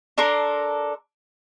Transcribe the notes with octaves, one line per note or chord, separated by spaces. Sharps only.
D4 A4 A#4 C6